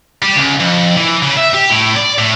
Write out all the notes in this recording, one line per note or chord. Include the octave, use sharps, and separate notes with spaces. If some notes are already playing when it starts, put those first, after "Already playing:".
G3
C#2
F2
E3
C#3
E5
G4
A2
D5
A2